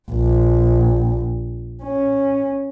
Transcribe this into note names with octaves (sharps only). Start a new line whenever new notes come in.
A#1
C#4